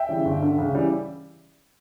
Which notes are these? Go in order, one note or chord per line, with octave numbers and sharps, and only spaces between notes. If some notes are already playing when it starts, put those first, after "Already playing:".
Already playing: E5 G5
C#3 E3 G3
G1
G2 D3
C#2
C#3 E3 G3